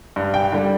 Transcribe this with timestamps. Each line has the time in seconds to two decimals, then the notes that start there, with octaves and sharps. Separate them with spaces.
0.16 G2
0.34 G5
0.52 D3 G3